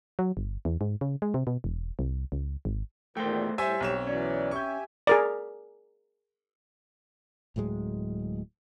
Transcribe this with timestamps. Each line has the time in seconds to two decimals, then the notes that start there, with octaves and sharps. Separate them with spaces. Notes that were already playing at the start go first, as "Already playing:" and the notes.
0.19 F#3
0.37 G1
0.65 E2
0.81 G#2
1.01 C#3
1.22 G#3
1.34 C3
1.47 B2
1.64 E1
1.99 C2
2.32 C#2
2.65 G#1
3.17 E2 A#2 D#3 A3 A#3 C5 G5
3.58 A2 G3 C5 E5 G#5
3.80 B1 C4 C#5 E7
4.07 E3 F#3 C#4 D5
4.51 G4 E5 G#5 C#6 G6
5.07 G#4 A#4 D5
7.56 D1 A2 F#3 G#3